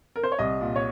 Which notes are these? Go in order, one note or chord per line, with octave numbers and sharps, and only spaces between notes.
A#4
C5
C#5
C2 D#5
A#2
C#5